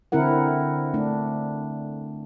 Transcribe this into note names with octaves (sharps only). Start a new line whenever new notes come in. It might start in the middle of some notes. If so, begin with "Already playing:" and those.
D3 C4 E4 A#4 F#5
A3 D4